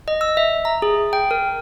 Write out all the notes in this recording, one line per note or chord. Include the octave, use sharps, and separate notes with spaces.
D#5
E6
E5
A#5
G#4
G5
A#4